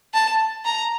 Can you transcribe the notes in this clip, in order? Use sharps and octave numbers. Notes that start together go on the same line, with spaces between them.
A5
A#5